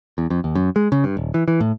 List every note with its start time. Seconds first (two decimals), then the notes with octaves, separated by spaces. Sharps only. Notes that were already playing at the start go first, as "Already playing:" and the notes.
0.18 E2
0.30 F2
0.44 D#2
0.55 F#2
0.76 G#3
0.92 C#3
1.04 G2
1.17 D#1
1.34 E3
1.48 E3
1.60 A2